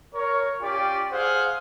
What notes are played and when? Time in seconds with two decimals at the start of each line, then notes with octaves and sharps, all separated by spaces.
0.14 A#4 C#5
0.61 C#4 F4 G4 D5
1.11 G#4 C5 F5 F#5